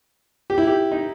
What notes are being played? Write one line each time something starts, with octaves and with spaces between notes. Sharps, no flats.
G4
E4
G4
D#4